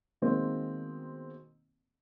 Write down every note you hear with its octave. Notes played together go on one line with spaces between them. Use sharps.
B2 D#3 G#3 A#3 C4